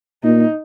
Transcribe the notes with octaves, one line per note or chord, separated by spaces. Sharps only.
A#2 D#4